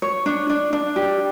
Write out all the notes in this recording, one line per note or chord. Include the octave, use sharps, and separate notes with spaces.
C#5
D4
D4
D4
G4